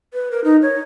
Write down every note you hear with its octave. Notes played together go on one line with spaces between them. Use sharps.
B4
A#4
D#4
C#5